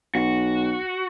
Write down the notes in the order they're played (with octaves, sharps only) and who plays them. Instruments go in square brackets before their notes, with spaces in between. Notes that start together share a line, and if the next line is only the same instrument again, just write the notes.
[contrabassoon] B1 [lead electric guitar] F#4